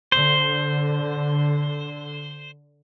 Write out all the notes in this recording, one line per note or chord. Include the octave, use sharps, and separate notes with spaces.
D3 C5